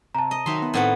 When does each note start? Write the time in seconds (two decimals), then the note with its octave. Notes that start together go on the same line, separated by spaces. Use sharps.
0.15 C3 A5 A#5
0.31 D#5
0.46 D#3 F#3 D#4 E5 C6
0.62 B3
0.74 A2 D#3 B3 C4 F#5